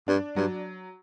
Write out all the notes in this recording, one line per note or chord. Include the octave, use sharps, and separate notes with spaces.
G2 D4
G2 F#3